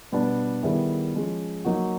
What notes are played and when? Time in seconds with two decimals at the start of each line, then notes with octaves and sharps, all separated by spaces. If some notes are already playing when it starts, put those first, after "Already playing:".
0.12 B2 G3 B3 D4
0.63 D#3 G3 B3 E4 G#4
1.14 F3 G#3 C#4
1.65 F#3 A#3 D#4 F#4